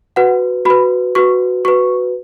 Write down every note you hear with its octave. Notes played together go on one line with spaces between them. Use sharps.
F#4 B4 F#5
F#4 B4 B5
F#4 B4 C#6
F#4 B4 C#6